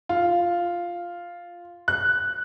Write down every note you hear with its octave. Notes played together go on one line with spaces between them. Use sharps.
F4
F#6